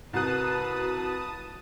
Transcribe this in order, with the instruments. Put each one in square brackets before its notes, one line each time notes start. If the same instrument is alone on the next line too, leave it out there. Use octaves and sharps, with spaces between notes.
[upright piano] C2 F#6 [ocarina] F#4 [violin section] B4 [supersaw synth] A5 D#6